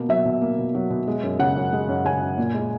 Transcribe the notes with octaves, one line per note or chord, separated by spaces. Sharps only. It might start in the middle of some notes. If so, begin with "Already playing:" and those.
Already playing: B2 A#3
F#3 E5
B2
A#3
B2
F#3
B2
G#3
F#2
C#3 F#5
F#2
G#3
F#2
C#3 G#5
F#2
A#2
G#3